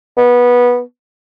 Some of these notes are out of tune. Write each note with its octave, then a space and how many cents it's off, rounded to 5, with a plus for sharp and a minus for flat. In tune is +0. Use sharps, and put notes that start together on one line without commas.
B3 -15